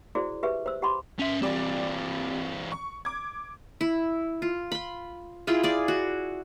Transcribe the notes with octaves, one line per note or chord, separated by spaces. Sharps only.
E4 F#4 G#4 C5 D5
G4 G#4 B4 E5
C5 E6
G4 F#5 A5 B5 C6 D6
C#4 E5
E3 G3 C4 D5
C#6
D6 G#6
E4
F4
B5 C6
E4 F4 G#4 G5
G#4 D5
F#4